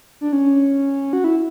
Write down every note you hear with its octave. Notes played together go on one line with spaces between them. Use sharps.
D4
C#4
F#4
E4